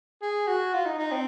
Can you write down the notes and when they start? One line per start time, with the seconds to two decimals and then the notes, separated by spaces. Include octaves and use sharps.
0.22 G#4
0.47 F#4
0.74 F4
0.86 D#4
0.99 D#4
1.12 C4